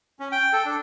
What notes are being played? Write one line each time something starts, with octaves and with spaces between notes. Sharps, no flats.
C#4
G5
A4
D4